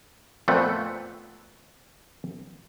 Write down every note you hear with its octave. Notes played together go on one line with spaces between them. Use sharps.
F2 A#2 A3 B3 C4 F#5